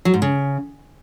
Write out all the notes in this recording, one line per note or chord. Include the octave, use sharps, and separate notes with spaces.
F#3
G#2
C#3